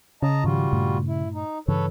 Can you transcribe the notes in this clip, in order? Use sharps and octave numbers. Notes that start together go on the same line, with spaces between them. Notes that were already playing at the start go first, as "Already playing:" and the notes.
C#3 D#5 A5 A#5
G#2 D#3 F3 G3 F4 F#4
G2 A#2 A3
E4
D#4
G2 C#3 E3 A4 B4 C#5